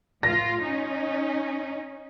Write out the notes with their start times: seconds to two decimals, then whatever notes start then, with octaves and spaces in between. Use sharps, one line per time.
0.23 A2 F4 A#6
0.61 C#4 D#4